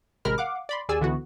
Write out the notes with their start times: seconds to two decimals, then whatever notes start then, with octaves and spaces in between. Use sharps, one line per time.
0.25 A1 C3 G#3 A#4 B5 F6
0.38 F5 F#5 D6
0.69 D5 B5 C6
0.89 D#2 G#4 D5 G#5 E6
1.01 C#2 D3 E3 B3 F#4